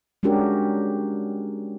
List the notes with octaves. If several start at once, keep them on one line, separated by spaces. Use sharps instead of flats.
G#3 C#4 D4 F#4 G4 A#4